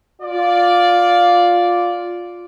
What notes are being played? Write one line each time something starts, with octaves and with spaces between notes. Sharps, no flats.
F4 D5